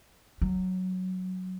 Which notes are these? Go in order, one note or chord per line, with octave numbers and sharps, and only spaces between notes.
F#3